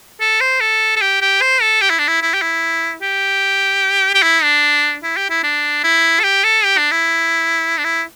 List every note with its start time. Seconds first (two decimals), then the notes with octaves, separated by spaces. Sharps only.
0.21 A4
0.41 C5
0.61 A4
0.96 A4
1.01 G4
1.21 G4
1.41 C5
1.61 A4
1.81 G4
1.90 E4
1.99 D4
2.08 E4
2.22 E4
2.34 G4
2.42 E4
3.02 G4
4.14 G4
4.23 E4
4.43 D4
5.03 E4
5.17 G4
5.30 E4
5.43 D4
5.84 E4
6.20 A4
6.24 G4
6.44 A4
6.64 G4
6.77 D4
6.91 E4
7.78 D4
7.84 E4